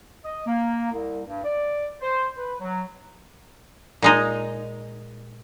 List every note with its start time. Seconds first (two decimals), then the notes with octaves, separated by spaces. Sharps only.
0.23 D#5
0.46 A#3
0.92 C2
1.25 G2
1.44 D5
2.01 C5
2.38 B4
2.60 F#3
4.02 A#2 G#3 D#4